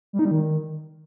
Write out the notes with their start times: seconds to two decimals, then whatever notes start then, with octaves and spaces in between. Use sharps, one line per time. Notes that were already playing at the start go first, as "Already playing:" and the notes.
0.13 G3
0.19 D#4
0.25 G3
0.31 D#3